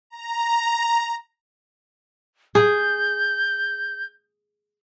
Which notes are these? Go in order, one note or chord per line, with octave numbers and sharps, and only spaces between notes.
A#5
G#4 G6